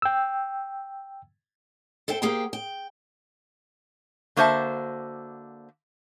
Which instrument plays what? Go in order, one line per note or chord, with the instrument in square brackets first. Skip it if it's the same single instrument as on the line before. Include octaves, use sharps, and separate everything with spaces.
[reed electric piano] G5 E6
[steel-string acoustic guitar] A4 C5 E5 G5
A#3 G4 G#4 C5 G5
G5
[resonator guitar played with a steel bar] D3 A#3 F#4 C5 E5 A5